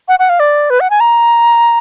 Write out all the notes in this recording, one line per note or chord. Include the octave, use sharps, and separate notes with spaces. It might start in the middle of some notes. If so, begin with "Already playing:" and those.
F#5
F#5
F5
D5
B4
F#5
G#5
A#5